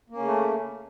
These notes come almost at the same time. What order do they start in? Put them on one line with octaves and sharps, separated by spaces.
A#3 C#4 C#3 A3